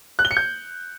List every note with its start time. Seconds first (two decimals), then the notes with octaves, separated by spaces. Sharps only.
0.19 F#6
0.25 G7
0.31 C#7
0.37 G6